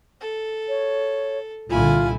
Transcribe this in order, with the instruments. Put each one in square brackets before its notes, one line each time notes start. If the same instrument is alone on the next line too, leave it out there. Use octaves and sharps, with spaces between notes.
[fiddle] A4
[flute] C#5
[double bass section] C2 A#2 D3 [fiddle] E4 G#5 [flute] F4